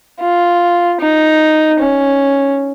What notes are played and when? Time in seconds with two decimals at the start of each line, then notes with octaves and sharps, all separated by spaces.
0.20 F4
1.00 D#4
1.79 C#4